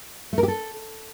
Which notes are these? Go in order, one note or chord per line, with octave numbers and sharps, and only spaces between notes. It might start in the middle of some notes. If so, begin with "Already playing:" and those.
A3
A#4
G4
A4